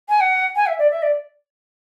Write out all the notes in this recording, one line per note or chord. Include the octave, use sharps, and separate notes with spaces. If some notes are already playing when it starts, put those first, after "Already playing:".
G#5
F#5
G#5
E5
D5
E5
D5